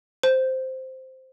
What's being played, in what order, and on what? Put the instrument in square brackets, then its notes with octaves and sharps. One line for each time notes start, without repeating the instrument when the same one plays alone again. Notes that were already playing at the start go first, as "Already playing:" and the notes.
[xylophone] C5